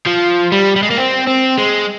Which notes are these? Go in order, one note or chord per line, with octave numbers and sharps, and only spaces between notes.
F3
G3
G3
G#3
A#3
C4
C4
G#3